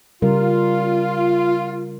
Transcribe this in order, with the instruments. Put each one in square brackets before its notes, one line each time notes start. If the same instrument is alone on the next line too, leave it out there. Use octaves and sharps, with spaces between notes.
[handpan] C#3 G3 A#4 [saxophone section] F4